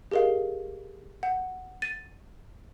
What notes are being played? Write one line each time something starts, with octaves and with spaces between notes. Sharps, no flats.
G4 G#4 A#4 D#5 F5
F#5
A6 D#7